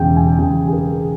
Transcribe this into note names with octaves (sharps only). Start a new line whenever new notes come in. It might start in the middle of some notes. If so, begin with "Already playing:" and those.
Already playing: E1 E2 C#3 G5
G#5
E1 E2 C#3 G5
G#4
A#4